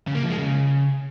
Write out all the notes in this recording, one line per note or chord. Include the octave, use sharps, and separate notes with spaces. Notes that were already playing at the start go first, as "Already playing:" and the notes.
C#3
A#3
F3
G#3
C#3